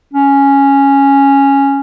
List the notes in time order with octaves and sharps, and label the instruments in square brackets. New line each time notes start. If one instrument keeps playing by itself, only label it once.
[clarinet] C#4